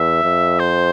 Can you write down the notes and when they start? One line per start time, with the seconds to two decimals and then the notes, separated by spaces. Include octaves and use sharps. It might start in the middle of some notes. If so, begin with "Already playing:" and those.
Already playing: E2 E5
0.24 F2
0.60 C5